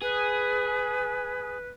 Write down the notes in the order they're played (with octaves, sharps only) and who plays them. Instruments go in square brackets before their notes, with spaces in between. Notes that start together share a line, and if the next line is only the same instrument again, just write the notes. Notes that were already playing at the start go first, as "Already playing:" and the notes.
[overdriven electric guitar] G#4 [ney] B4